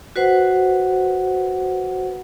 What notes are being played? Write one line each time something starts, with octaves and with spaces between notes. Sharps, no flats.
F#4 B4 C5 F#5